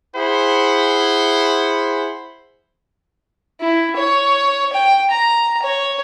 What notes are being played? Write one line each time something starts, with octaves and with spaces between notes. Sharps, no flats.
E4 G#4 C5 F#5 B5
E4
C#5
G5
A#5
C#5